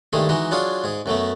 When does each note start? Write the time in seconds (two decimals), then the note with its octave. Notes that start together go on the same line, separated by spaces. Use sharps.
0.13 G2 D#3 G#3 A3 G#4
0.29 E3 G#3 D#4 F#4
0.51 F#3 D4 F4 G#4 C#5
0.84 G#2 G#4
1.06 F#2 F#3 A3 B3